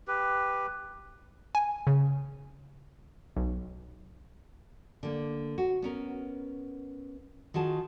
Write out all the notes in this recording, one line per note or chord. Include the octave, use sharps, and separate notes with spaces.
G4 B4
G#5
C#3
B1
D3 A#3
F#4
B3 C#4 A#4
D#3 F4 F#4 G#4 A5